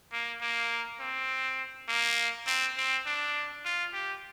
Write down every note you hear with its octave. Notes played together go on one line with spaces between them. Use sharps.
A#3
A#3
C4
A#3
C4
C4
D4
F4
G4